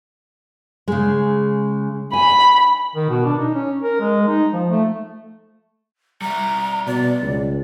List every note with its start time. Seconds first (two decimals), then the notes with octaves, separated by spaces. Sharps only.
0.88 C#3 G#3
2.13 G#5 B5
2.96 D#3
3.09 B2
3.25 D4
3.38 D#4
3.54 C#4
3.83 A#4
4.01 G#3
4.28 D#4
4.53 F3
4.69 A3
6.21 G3 E5 A#5
6.87 B2 D5
7.22 C#2